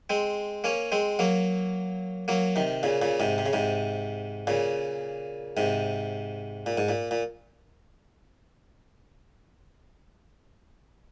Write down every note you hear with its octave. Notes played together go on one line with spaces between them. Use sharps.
G#3 C4
A#3 C#4
G#3 C4
F#3 A#3
F#3 A#3
C3 D#3
A#2 C#3
A#2 C#3
G#2 C3
C3
C#3
G#2 C3
A#2 C#3
G#2 C3
A#2
G#2
A#2
A#2